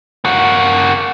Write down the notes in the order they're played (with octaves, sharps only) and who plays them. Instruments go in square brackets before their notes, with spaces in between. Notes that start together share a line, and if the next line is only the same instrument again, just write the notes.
[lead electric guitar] A#3 F#4